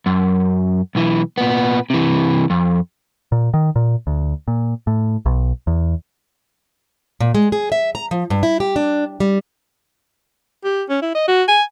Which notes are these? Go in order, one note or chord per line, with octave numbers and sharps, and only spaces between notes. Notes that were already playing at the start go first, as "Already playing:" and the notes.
F#2
B1 E3
A#2 B3
C3 E3
F2
A#2
D#3
A#2
D2
A#2
A2
B1
E2
A#2
G#3
G#4
E5
A#5
F3
G2
E4
G4
D4
G3
G4
C#4
E4
D#5
F#4
G#5